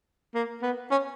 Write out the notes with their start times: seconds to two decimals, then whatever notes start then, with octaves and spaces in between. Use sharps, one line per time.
0.35 A#3
0.63 B3
0.91 C#4